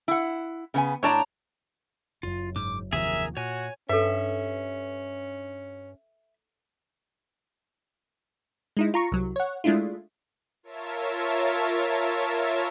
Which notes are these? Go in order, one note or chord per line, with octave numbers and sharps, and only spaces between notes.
E4 F#5
C#3 B3 G#5
A2 D4 C#5 D5 A5 A#5
F#1 F#2 F4
G#2 D6
D#2 C3 F3 G#4 A#4 E5
A#2 F#4 C#5 G#5
G2 C#4 A4 B4 E5
G#3 D#4 E4
F4 A#5 C#6
C2 F#3
C#5 F#5
G#3 A3 D4 E4 F4
F4 A#4 C#5 E5 A5